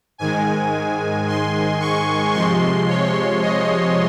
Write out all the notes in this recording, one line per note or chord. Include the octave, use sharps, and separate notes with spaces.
G#2 D#3 G#3 G#5
C6
C#6
C3 F3 G#3 C6
C#5
D#5